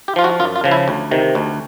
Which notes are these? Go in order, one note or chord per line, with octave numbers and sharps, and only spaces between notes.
G4
F3 F4
F#4
F#2 F4
F4
C#3 F3
E4
D2
C3 D#3
D2